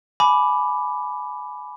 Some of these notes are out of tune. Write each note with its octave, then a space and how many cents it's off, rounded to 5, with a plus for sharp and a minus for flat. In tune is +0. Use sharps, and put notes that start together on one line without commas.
G#5 +25 B5 +0 D6 +0